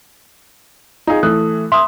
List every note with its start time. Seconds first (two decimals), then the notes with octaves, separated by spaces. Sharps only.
1.07 D#4 F4 G#4
1.23 E3 A3 D#6 F#6
1.72 E5 C6 D#6